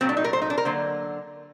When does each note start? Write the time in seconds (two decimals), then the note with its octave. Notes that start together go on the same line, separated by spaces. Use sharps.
0.01 A#2 F#3 A3 C4
0.09 D4
0.17 D#4
0.24 A#4
0.33 C5
0.42 D#4
0.50 D4
0.58 A#4
0.65 D3 F#3 A#3 C5